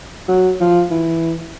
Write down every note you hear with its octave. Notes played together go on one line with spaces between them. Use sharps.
F#3
F3
E3